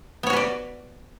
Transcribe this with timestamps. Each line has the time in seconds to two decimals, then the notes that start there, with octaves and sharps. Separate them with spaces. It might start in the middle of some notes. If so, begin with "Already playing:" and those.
0.23 B3
0.27 C#5
0.30 F#4
0.33 B4
0.36 D5